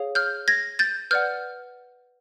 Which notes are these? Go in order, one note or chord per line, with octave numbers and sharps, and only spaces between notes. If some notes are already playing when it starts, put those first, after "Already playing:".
Already playing: G#4 C#5 F5
F6 G6
G#6 A#6
G6 A6
B4 D5 F#5 F6 G6